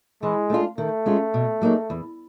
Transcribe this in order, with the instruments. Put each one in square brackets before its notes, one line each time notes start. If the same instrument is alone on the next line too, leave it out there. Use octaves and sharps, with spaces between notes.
[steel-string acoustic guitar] E3 [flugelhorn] G#3
[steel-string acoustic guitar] A3 D4 F4
[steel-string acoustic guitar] D#3 [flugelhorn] A3
[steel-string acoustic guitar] G#3 C#4 F4
B2
F#3 A#3 D#4 G#4
E2